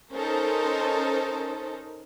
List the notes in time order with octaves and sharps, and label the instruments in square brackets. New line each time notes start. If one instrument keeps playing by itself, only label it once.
[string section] C#4 D#4 A4 A#4 C5